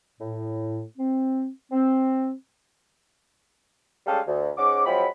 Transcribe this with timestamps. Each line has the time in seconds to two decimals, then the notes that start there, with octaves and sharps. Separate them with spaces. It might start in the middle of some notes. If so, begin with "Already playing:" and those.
0.20 A2
0.98 C4
1.72 C4
4.07 G3 G#3 C#4 G4 A4 F5
4.27 D2
4.57 G#2 C#4 F#5 D6
4.86 F3 F#3 G#3 C4 B5